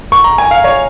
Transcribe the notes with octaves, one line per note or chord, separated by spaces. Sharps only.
C#6
A#5
G#5
F5
C#5